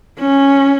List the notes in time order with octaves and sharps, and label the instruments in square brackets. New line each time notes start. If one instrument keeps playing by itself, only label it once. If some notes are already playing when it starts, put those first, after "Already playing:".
[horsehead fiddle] C#4